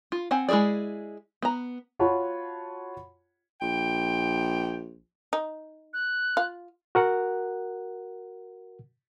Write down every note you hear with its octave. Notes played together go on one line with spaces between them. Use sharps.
F4
C4 F#5 G#5
G#3 E4 F#4 G#4 D5
B3 A#5
F4 F#4 C#5 F#5 A5 B5
A#1 G5
D#4
F#6
F4
F#4 A#4 F#5